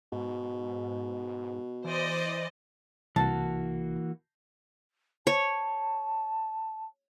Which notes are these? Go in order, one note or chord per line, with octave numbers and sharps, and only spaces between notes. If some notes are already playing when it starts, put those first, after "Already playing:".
G#2 B2
E3 C5 D5 D#5
C2 E3 A#3 F#4 A5
C#5 A5